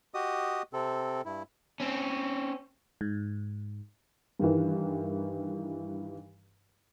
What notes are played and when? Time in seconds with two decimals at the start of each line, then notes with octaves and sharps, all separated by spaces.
0.14 F#4 G4 D#5 D#6
0.73 C3 C4 A4
1.25 G2 E4
1.80 C4 C#4
3.01 G#2
4.39 G2 D#3 E3